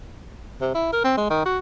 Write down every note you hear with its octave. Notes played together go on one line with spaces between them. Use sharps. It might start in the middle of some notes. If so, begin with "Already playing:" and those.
C3
E4
A#4
C4
G#3
D#3
F#4